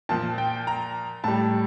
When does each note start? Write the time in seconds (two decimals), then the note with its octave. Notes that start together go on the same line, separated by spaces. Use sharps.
0.09 A#2 F3 A5
0.38 G5
0.67 A#5
1.24 A2 G3 A5